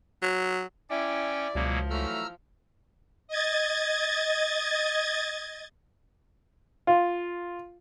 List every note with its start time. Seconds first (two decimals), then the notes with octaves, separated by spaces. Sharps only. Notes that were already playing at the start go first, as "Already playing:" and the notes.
0.23 F#3
0.90 C#4 E4 D5 G5
1.55 C#2 B2 F3 F#3 A#3
1.90 E3 F#3 A3 A#5 E6 F6
3.28 D#5 G#6 A6
6.87 F4